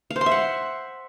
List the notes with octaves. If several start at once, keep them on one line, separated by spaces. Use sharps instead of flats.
F5
C5
C6
E5
F#5